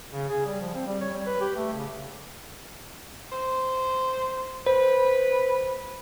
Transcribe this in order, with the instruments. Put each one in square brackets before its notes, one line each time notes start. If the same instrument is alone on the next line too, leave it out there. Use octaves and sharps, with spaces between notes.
[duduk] C#3
G#4
G3
F3
C4
G3
C#5
G3
B4
G4
A3
C#3
[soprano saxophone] C5
[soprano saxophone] B4 [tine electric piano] C5